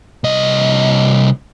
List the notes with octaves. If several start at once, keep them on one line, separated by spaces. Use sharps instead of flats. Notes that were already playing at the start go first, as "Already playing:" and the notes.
C2 D#5